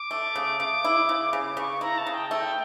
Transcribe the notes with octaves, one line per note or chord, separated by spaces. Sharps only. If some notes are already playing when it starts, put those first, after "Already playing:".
Already playing: D6
A3
C#3
C#3
E4
C#3
C#3 D6
C#3 C#6
E4 A#5
A5
C#3
G5
A3 G5